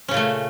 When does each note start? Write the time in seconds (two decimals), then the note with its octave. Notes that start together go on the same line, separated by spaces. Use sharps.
0.08 C#4
0.11 C#3
0.14 A#2
0.17 A3